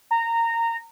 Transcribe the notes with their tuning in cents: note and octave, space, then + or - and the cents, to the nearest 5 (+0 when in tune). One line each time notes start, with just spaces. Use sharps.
A#5 -20